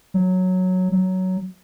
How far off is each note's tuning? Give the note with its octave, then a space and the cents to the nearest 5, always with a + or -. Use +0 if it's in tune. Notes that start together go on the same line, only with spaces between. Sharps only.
F#3 -5
F#3 +10